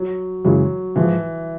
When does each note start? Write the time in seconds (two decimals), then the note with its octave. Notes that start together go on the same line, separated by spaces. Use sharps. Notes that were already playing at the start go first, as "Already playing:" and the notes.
Already playing: F#3
0.45 F#2 C#3 E3 F#3 G#3
0.96 G#2 E3 F3 G#3